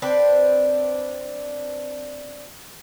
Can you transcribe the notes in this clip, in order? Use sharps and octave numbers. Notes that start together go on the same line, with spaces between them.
C4 D4 B4